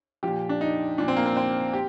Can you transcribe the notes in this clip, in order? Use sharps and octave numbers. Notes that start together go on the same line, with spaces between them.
A#2 F3 G4
D4
D#4
A#2 F3 D4
C4
A#3
C4
C4
G4